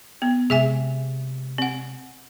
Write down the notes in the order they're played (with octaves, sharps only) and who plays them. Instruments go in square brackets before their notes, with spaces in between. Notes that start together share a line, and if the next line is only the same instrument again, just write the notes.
[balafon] B3
[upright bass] C3 G#3 [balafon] G#4 E5 G#5
[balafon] C4 F#5